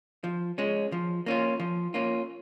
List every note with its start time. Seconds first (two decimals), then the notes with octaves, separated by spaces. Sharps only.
0.24 F3
0.58 G#3 C#4
0.92 F3
1.26 A#3 C#4 F4
1.60 F3
1.94 A#3 C#4 F4